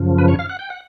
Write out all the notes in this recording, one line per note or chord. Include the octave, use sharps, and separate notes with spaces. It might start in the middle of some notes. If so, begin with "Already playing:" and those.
Already playing: F#2 C#3 F3
B4
C#5
F5
F#5
G5
F#5